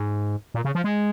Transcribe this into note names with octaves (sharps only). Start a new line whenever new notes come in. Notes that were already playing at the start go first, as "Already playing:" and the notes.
Already playing: G#2
A#2
C#3
F3
G#3